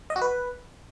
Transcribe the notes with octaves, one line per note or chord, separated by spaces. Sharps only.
D#5
F#4
B4